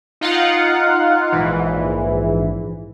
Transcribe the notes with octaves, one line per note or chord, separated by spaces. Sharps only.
D#4 F4 F5 F#5
A#1 G#2 E3